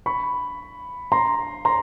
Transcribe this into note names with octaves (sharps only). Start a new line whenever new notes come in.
B5 C#6
A#5 C6
A#5 C6